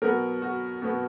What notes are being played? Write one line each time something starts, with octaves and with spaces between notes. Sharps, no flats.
B2 F#3 B3 A#4
F#4
B2 F#3 B3